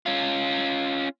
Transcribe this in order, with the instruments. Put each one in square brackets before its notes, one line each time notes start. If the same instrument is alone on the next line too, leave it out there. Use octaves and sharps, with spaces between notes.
[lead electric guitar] C#4 F4